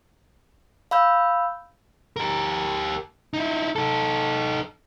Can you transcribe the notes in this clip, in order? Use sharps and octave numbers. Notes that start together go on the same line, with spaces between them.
F5 B5 E6 G6
G4 A#4
D#4 E4
D#4 A4